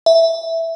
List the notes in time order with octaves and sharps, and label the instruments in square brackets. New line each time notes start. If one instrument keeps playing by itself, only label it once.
[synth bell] E5